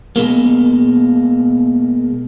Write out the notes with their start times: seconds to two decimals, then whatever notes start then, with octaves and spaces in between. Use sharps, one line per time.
0.16 B2 G#3 A#3